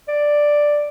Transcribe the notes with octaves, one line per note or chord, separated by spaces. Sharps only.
D5